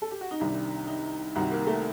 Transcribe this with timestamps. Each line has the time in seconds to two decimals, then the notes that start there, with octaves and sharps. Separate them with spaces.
0.02 A4
0.11 G4
0.21 F#4
0.31 D#4
0.40 C2 C3 D#3 D4
0.87 D#4
1.35 C2 C3 D#3 F#4
1.52 A#3
1.67 A3